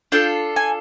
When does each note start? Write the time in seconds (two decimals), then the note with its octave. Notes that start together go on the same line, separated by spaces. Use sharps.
0.12 D4 F4 A4 G5
0.56 G#5